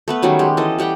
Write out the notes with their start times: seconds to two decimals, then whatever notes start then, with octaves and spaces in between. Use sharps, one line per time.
0.08 A3 B3 B4
0.23 D#3 F#3 G3 C#4
0.39 G#3 G4
0.57 E3 A4 D#5
0.78 G3 G4 F#5 G5